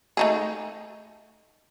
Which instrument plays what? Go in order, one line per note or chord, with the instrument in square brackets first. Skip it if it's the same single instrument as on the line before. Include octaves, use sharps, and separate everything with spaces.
[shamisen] A3 D#4 G#4